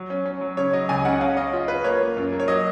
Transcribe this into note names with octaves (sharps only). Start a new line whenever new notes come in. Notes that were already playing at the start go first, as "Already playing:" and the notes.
Already playing: F#3
C#4
C#4
F#3
C#3 C#5
F#3 D#5
C#2 G#5
C#3 F#5
C#4 F5
C#4 D#5
F4
F4 B4
A#3 C#5
A#3
F#2
A#3
C#5
F#3 D#5